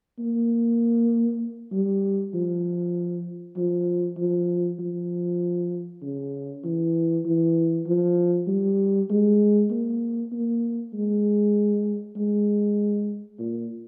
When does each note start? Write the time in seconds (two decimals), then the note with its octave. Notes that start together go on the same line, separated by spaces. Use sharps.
0.19 A#3
1.72 G3
2.34 F3
3.56 F3
4.18 F3
4.79 F3
6.02 C#3
6.64 E3
7.25 E3
7.87 F3
8.47 G3
9.10 G#3
9.70 A#3
10.32 A#3
10.93 G#3
12.16 G#3
13.39 A#2